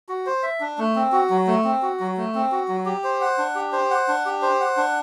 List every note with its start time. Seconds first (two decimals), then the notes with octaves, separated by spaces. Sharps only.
0.09 F#4
0.26 C5
0.43 E5
0.60 D4
0.78 A3
0.96 C4
1.12 F#4
1.30 F#3
1.47 A3
1.64 C4
1.82 F#4
2.00 F#3
2.17 A3
2.35 C4
2.52 F#4
2.68 F#3
2.86 G4
3.04 C5
3.21 F#5
3.38 D4
3.55 G4
3.72 C5
3.91 F#5
4.08 D4
4.26 G4
4.42 C5
4.60 F#5
4.77 D4